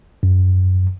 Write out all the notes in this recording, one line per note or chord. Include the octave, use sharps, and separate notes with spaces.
F#2